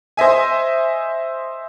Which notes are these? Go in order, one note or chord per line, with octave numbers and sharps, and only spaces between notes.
C5 D#5 E5 G#5